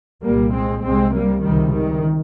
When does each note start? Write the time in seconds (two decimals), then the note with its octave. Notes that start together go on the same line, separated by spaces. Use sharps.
0.23 C2 A#2 G3 A#3
0.54 G#3 C4
0.84 C2 C3 G#3 C4
1.14 G3 A#3
1.43 C#2 C3 D#3 G3
1.73 D#3